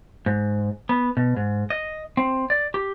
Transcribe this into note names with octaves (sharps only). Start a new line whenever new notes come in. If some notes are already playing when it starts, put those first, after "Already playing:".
G#2
B3
B2
G#2
D#5
C4
D5
G4